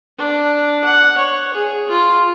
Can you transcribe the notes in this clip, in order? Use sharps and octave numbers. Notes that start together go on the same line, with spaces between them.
D4
F#5
C#5
G#4
F4